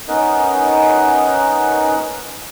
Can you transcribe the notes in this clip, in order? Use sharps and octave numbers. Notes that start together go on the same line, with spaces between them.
B3 C#4 D#4 A#4 D#5 F#5